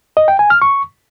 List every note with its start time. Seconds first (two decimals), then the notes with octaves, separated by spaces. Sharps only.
0.17 D#5
0.28 G5
0.39 G#5
0.50 F6
0.62 C#6